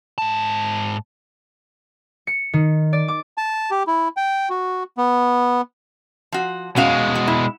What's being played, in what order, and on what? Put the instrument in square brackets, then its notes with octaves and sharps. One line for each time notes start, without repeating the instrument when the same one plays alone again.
[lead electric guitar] G#2 A5
[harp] C#7
D#3
D5
D6
[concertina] A5
G4
E4
G5
F#4
B3
[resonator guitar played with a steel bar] F3 F#4
[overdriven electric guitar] B2 G#3 [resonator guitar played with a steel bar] C#4 F#4 F5
[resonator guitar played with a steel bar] F#4
E4